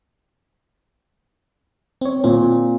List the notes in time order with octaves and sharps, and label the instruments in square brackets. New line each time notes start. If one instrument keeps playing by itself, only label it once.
[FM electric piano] C4 C#5
[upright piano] A#2 [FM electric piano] C4